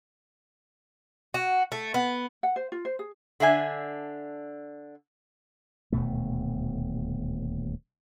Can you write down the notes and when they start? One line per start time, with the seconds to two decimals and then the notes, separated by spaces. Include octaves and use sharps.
1.34 F#4
1.72 A3
1.94 B3
2.43 F#5
2.56 C5
2.72 F4
2.85 C5
2.99 G#4
3.40 D3 D4 E5 G#5
5.92 D#1 D2 B2 A3